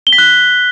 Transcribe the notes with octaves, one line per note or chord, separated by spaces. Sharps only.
G7
B6
F#6